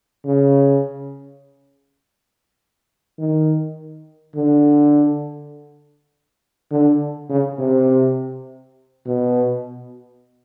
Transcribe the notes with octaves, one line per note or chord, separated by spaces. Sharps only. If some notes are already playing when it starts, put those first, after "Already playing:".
C#3
D#3
D3
D3
C#3
C3
B2